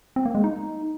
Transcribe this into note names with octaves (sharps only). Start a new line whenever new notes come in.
C4
A#3
G#3
D#4